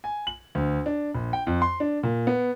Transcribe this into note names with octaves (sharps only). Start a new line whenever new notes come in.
G#5
F#7
D2
D4
A#1
G5
F2
C6
D4
A#2
B3